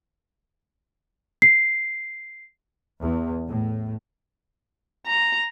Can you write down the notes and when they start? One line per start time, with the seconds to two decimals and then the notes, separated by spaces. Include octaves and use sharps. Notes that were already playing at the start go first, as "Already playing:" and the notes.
1.42 C7
3.01 E2
3.47 A2
5.07 A#5